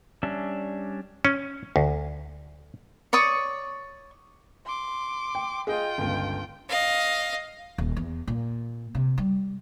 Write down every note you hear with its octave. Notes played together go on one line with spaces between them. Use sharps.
G3 C#4 D4 E5
C#4
D2
C#5 D5 C#6 D#6
C6 D6
G5
F4 G#4 D#5 G5
G1 C#2
D#5 F5
D#1
E2
A#2
C3
G3